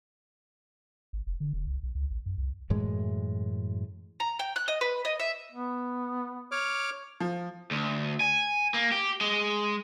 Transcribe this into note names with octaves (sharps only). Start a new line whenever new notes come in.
G#1
F1
D3
E1
C2
B1
C#2
A1
F#2
C2
F#2 A2 E3 G#3
A#5
G5
F#6
D#5
B4
D#5
E5
B3
C#5 D6 F6
F3
D2
G#5
A#3
G4
G#3